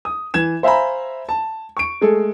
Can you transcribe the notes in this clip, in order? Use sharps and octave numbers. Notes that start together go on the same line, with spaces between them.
D#6
E3 G#6 E7
C5 E5 F5 G#5 A#5 B5
A5
C#6 D7
G#3 A3 G#4 A4